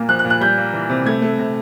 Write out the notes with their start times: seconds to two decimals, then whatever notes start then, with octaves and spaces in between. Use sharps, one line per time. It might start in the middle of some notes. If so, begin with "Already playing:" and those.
Already playing: A#2 A#3
0.09 F3 F#6
0.19 F#6
0.25 A#2
0.30 F#6
0.41 G3 G6
0.57 A#3
0.73 E3
0.89 C3
1.06 A3 G#6
1.22 A3
1.39 C3